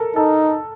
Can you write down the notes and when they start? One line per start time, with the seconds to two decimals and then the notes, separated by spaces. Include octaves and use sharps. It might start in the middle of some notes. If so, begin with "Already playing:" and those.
Already playing: A4 A#4
0.16 D#4 A4